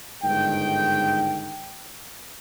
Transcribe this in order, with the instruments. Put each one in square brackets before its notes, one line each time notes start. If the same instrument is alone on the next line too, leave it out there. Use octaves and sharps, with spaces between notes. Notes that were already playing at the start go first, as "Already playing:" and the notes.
[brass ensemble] G1 G#2 D#3 G5